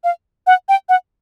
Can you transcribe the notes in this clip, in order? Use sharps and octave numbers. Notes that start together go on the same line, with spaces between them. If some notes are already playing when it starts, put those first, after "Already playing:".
F5
F#5
G5
F#5